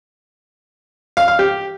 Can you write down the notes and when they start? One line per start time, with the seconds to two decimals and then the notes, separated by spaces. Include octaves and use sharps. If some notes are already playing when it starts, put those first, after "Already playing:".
1.17 F5
1.28 F5
1.39 G4